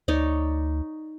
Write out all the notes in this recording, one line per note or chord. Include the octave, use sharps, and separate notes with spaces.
D2 D#4 C#5 D5